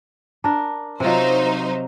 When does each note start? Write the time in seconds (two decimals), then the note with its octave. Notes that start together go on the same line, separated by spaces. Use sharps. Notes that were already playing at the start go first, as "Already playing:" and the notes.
0.44 D4 A#4
1.00 C3 F#3 D#4 F4 C5